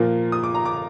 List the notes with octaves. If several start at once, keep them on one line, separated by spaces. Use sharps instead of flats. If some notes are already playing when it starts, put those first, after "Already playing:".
Already playing: A#2 F3 A#3
D#6
D6
A#5
D6